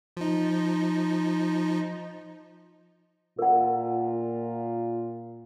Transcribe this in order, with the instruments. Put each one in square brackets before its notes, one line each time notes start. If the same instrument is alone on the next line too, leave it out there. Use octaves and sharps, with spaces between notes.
[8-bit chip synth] F3 D#4
[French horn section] A#2 F4 [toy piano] A#4 F#5